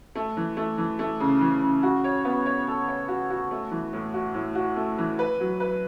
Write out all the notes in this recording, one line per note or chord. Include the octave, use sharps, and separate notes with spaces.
A3
E3
A3
E3
A3
C#3
E3
C#3
F#4
C#5
B3
C#5
A4
C#5
F#4
F#4
A3
E3
A2
F#4
A2
F#4
A3
E3
B4
F#3
B4